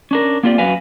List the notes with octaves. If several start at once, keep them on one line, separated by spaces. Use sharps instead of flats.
C#4 D4 A#4
A#3 C4 F4 G4 D5
F#2 F#4 B4 F5 G#5